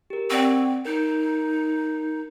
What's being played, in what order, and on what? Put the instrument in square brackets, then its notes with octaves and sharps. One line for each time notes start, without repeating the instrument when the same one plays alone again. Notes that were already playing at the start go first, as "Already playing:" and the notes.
[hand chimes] G4 A#4
[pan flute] C4 [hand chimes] D5 F#5 C#6
[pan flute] D#4 [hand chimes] A#4 G6 D7